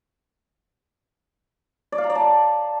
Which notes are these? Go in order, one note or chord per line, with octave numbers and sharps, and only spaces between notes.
D5
F5
A#5
D5
A5